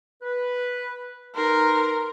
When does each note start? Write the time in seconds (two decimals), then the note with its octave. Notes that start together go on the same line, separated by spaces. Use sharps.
0.23 B4
1.36 D#4 A#4 B4 C6